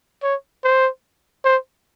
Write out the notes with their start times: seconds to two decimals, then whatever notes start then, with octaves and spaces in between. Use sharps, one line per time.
0.23 C#5
0.64 C5
1.45 C5